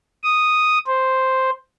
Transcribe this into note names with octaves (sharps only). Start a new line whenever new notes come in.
D#6
C5